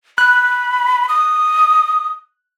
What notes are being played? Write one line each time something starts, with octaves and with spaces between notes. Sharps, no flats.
B5 F#6
D#6